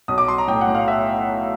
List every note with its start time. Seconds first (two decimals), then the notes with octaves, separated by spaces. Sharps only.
0.08 B1 D#6
0.18 D6
0.28 F#3 C6
0.38 A#5
0.47 A2 G5
0.61 F#5
0.68 A2
0.75 F5
0.88 E5